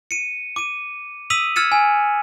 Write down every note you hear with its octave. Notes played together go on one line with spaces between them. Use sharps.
C#7 D#7
D6 D#7
D#6 E6 B6 D#7 F7 F#7
E6 F6 G#6 A6 C#7 E7
G#5